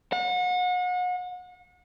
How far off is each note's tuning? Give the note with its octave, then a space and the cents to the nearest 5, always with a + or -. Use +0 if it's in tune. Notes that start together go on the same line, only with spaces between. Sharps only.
F#5 -35